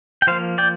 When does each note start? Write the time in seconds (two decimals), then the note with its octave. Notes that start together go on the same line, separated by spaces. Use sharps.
0.22 G5
0.27 F3 A#3 C5 F5
0.58 D5 G5